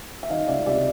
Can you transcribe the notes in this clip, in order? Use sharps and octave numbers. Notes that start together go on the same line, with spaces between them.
E5
D#3 D#5 F5
C#2 D5 E5
C3 D5 E5